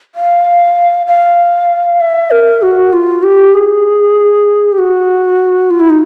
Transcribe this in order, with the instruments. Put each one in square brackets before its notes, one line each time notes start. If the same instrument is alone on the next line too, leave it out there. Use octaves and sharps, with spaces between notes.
[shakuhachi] F5
F5
E5
A#4
F#4
F4
G4
G#4
G4
F#4
F4
E4
D#4